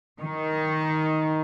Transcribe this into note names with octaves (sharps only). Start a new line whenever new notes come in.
D#3